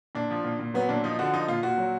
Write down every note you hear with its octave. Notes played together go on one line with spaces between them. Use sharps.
A#2 D4
F3
A#2
A#2
F#3 B3
A#2 D4
F3 D#4
D3 F#4
F3 D#4
A#2 F4
A#2 F#4
F#3